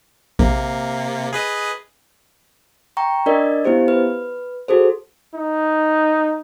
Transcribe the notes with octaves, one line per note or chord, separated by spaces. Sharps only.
A#1 C3 A#3
G#4 B4 D#5
G5 A#5 C#6
D4 A#4 D5 D#5
B3 E4 G4 C5
B4
F#4 G#4 A4 C5
D#4